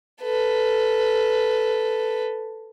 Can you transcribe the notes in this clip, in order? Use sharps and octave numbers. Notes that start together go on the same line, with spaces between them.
A4 B4